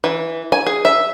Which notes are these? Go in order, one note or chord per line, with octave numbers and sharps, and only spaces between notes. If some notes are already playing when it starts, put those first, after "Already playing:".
E3
G#5
G#4
E5